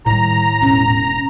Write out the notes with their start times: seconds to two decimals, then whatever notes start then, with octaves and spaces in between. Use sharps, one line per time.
0.06 A2 D#3 G3 A#5
0.61 E1 C#4